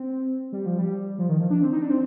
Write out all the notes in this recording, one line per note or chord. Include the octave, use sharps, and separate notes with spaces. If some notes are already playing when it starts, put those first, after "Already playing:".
Already playing: C4
G3
F3
G3
F3
D#3
F3
D4
C4
D#4
D4
C4